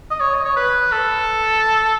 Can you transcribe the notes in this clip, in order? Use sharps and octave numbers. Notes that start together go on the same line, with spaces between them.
D#5
C#5
D#5
C#5
B4
A4